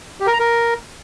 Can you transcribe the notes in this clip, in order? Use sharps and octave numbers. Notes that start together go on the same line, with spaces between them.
G4
A#4
A#5
A#4